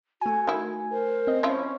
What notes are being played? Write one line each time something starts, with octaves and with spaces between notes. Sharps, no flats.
A3 F#4 G#5
D#3 E4
A#4 C5
C4 D#5
F3 C#4 E4 F4